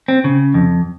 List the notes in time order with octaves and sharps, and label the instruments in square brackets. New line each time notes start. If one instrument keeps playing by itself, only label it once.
[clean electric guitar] C4
C#3
F2